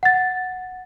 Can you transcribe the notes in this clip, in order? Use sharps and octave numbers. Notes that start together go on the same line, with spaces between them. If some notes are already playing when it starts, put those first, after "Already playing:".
F#5 A6